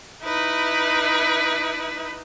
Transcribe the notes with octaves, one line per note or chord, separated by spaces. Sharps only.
D#4 E4 B4